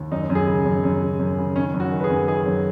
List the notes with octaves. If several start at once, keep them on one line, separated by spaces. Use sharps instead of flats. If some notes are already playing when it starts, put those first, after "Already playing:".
Already playing: D#2
F#2 D#4
F#2
G#4
C#3
F#2
F#2
C#3
F#2
C#3
D#3 C#4
F#2
F#4
D#3
B4
G#4
F#2
D#3 G#4
F#2